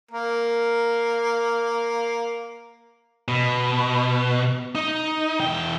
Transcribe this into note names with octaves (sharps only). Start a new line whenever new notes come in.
A#3 A#4
B2
D#4
E2 G5